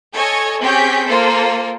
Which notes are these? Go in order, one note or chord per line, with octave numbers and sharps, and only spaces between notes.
A4 C#5 D#5 G#5
C4 C#4 G4 G#4 G6 B6
A#3 F4 A4 C5